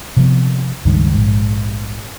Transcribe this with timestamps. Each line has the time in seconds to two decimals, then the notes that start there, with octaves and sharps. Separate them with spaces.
0.17 C3 F3 B3
0.85 C#2 G2 D#3
1.14 A#1 G#2